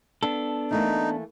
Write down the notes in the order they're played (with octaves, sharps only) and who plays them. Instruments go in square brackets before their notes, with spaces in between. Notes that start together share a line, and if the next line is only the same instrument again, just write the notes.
[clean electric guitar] B3 D4 A4
[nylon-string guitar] E3 A3 A#3 [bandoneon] D#4